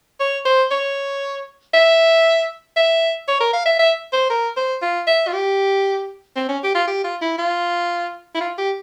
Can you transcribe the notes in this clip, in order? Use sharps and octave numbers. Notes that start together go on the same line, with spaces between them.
C#5
C5
C#5
E5
E5
C#5
A#4
F5
E5
E5
C5
A#4
C5
F4
E5
F4
G4
C4
C#4
G4
F4
G4
F4
E4
F4
E4
F4
G4